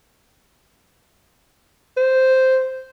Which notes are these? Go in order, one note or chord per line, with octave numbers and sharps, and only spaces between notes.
C5